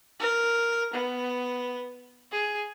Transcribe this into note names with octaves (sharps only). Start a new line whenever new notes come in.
A#4
B3
G#4